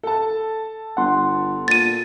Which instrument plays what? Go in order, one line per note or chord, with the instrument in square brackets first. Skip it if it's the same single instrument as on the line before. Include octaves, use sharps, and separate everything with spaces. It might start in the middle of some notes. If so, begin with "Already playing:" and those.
[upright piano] A4 A5
[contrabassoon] G1 [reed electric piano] F#5 C6
[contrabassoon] A#2 [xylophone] A6 D#7